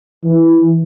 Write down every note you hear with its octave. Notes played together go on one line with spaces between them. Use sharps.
E3